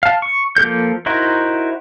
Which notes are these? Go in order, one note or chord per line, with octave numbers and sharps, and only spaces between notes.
F5 A5
C#6
F3 A#3 A4 G6
D#4 E4 F#4 A#4 C5